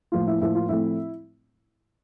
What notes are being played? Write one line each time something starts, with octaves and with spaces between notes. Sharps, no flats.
A2 F3 A#3 F4
E4
A2 F3 A#3 E4
F4
A2 F3 A3 C4 E4